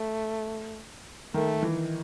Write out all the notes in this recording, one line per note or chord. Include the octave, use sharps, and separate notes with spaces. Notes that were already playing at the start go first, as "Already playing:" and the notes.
Already playing: A3
D#3 A3
E3